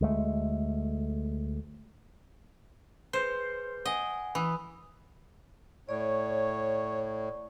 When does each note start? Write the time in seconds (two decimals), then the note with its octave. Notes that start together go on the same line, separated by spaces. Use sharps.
0.01 D2 G#3 A3
3.13 G#4 B4 C5 G6
3.85 D#5 F#5 G#5
4.35 E3 B5 D#6
5.89 A2 C#5 D5 C#6